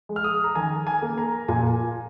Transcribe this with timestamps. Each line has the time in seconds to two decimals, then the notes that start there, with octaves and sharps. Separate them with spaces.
0.09 G#3
0.16 F6
0.24 D#6
0.44 A#5
0.55 D#3 G#5
0.87 G#5
1.02 A#3
1.18 A#5
1.48 A#2 G#5